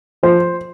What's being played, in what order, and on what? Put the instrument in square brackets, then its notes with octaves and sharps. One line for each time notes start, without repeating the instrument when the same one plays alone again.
[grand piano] F3 C5